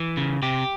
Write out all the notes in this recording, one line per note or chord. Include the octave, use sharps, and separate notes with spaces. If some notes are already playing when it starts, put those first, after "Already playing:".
Already playing: E3
C#3
C3 G4